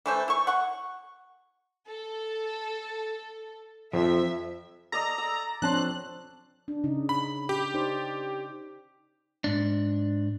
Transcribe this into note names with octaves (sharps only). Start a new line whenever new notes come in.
E3 A3 C5
E4 C#6
F#5 C#6
A4
F2 F3 E5
A4 D5 D#5 A#5
E6
F3 C4 D4 C#5 A5 C6 F#6
D4
C#3 D#4
B5
G4
D#4 C5 D5
G#2 D4